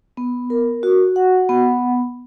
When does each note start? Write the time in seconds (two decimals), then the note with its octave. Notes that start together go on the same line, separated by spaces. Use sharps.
0.17 B3
0.50 A#4
0.83 F#4
1.16 F#5
1.49 B3